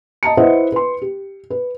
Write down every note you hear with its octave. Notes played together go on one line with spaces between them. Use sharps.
D#5 A5 A#5 C#7
E4 B4 C5 D#5 E5 F#5
B4 C6
G4
B4